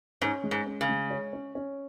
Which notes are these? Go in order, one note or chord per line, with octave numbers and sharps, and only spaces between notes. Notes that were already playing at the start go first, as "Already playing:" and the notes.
G#2 C#4
G#3
G#2
C#4
C#3
G#3
C#5
C#4
C#4